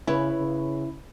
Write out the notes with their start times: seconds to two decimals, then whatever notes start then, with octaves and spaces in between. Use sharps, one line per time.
0.07 C#3 E4 B4 C#5
0.39 C#3